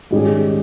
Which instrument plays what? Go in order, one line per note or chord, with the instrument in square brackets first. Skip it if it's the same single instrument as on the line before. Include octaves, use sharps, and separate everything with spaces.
[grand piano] G#2 D#3 G3 C#4 G#4